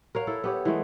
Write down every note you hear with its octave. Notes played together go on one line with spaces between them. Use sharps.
A#4 C#5 F5 F#5
E4 A4
B3 G4 C#5
E3 G#3 A3